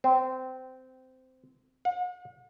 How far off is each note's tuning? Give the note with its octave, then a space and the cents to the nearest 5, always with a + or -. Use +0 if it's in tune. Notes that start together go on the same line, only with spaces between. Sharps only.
C4 -15
F#5 -45